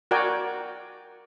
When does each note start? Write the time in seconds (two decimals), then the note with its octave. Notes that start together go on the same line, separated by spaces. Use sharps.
0.11 F#4 A#4 D5 G5 G#5